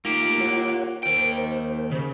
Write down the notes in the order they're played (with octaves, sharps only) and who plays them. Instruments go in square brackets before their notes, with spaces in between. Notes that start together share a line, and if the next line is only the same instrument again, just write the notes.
[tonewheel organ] A3 D#4 F4 [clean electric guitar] A#3 G4
[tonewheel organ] F4 C#5 F#5
[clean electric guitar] D#2 G5 [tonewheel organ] A#4 C5
[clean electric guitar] C#3